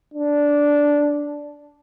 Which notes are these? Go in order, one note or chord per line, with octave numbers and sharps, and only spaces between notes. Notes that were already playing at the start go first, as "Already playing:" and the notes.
D4